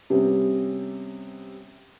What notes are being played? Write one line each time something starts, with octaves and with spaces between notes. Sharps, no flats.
C3 G3 B3 C#4